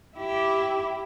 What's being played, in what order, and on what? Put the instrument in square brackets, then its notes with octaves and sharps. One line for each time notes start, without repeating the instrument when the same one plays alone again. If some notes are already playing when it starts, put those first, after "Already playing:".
[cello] E4 G4